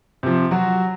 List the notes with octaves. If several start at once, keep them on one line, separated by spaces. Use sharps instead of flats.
C3 F3
F#3 F#4